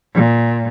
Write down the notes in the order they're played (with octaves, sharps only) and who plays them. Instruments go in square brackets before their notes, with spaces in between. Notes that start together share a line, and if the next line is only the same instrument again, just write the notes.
[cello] A#2